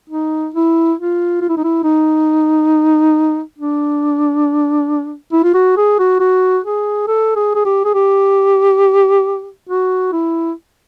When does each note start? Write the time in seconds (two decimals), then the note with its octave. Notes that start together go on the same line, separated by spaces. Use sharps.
0.10 D#4
0.54 E4
0.98 F4
1.42 F4
1.49 E4
1.57 D#4
1.64 E4
1.84 D#4
3.58 D4
5.33 E4
5.44 F4
5.54 F#4
5.77 G#4
5.99 F#4
6.20 F#4
6.64 G#4
7.08 A4
7.36 G#4
7.55 G#4
7.65 G4
7.85 G#4
7.94 G4
9.69 F#4
10.13 E4